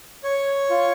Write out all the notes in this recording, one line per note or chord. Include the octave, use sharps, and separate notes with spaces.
C#5
F4